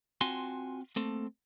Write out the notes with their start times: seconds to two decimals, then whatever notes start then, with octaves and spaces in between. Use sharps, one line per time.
0.21 C4 F4 F#4 G#5 A5 C6
0.96 A3 A#3 C4 A4